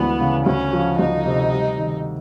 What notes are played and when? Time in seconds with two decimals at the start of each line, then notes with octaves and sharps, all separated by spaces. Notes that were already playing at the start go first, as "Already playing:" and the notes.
Already playing: D2 E3 G#3 B3
0.20 C#3
0.46 D2 C#4
0.73 F3
0.99 D2 D#4
1.25 C3
1.52 G3
1.78 D#3